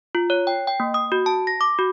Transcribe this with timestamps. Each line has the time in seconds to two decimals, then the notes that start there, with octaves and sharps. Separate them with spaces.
0.15 F4
0.30 C#5
0.47 G5
0.67 G5
0.80 A#3
0.94 D#6
1.12 F#4
1.26 A5
1.47 A#6
1.61 D6
1.79 F#4